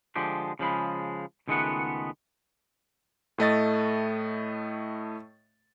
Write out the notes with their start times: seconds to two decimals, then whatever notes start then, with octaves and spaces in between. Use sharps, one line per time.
0.16 D3 F3 G#3 G4
0.59 C#3 F3 G#3 B5
1.48 C#2 D#3 G#3 A3 B3 F#5
3.38 A2 A3 D#5 A6